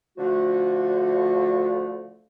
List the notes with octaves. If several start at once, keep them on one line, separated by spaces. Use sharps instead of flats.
D3 F3 A3 F#4